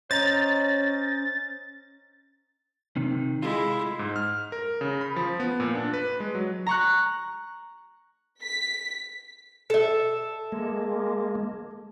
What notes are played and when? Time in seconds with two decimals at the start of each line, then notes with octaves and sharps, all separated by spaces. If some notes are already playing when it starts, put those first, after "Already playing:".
0.11 C#4 C5 C#5 D#5 A#5 A6
2.96 C3 D#3
3.42 G#3 E4 F4
3.99 G#2
4.16 F6
4.52 A#4
4.81 C#3
5.01 B5
5.16 F3
5.40 B3
5.60 A#2
5.75 D4
5.93 B4
6.20 G#3
6.35 F#3
6.66 A#5 C#6 F#6
8.41 B6
9.70 A4 E5
10.52 G#3 A#3